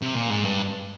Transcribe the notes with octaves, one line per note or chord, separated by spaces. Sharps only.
C3
A#2
G#2
G2